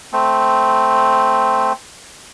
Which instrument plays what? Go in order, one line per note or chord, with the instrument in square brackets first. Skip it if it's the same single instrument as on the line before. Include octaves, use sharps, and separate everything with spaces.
[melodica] A3 C4